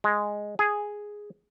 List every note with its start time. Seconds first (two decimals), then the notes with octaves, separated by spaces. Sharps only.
0.04 G#3
0.59 G#4